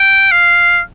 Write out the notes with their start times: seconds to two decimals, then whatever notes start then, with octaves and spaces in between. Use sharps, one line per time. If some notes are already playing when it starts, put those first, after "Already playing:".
Already playing: G5
0.31 F5